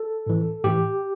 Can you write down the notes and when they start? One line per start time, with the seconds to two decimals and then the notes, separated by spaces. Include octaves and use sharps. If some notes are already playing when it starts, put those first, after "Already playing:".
Already playing: A4
0.26 A2 E3
0.64 A2 E3 G4